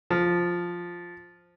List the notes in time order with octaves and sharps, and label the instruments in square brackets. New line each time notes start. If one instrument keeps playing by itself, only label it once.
[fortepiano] F3